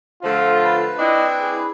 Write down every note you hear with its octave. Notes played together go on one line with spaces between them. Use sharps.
D3 F3 A3 F4
B4
C4 D4 E4 D#5
G#4